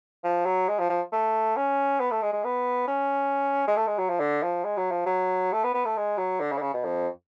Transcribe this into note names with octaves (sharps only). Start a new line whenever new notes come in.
F3
F#3
G#3
F3
F3
A3
C#4
B3
A3
G#3
G#3
B3
C#4
G#3
A3
G#3
F#3
F3
D3
F3
G#3
F#3
F3
F#3
A3
B3
B3
A3
G#3
F#3
D3
C#3
D3
C#3
B2
F2